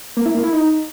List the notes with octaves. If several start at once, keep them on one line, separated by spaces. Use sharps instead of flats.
A#3
E4
A#3
E4
D#4